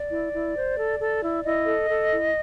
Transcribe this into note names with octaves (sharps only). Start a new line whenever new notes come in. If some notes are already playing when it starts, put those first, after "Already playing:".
Already playing: D5
E4
E4
C5
A4
A4
E4
E4 D#5
A4
A4
E4